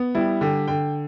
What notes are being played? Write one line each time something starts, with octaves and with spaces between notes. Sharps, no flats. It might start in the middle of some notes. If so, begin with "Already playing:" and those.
Already playing: B3
G3 E4
D3 G4
D3 G5